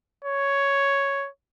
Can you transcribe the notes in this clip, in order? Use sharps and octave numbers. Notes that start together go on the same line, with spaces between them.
C#5